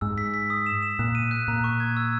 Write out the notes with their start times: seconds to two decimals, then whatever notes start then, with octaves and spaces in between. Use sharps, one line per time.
0.01 G#2 E6
0.18 B6
0.34 B6
0.50 D#6
0.66 E7
0.82 E7
0.99 A#2 F#6
1.15 D#7
1.31 F#6
1.48 A#2 A#5
1.64 C#6
1.80 G#6
1.97 E6